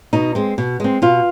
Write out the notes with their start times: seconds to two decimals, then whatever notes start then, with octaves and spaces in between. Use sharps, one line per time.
0.13 B2 D#4
0.35 G#3 C4
0.58 B2
0.80 G#3 C4
1.02 B2 F4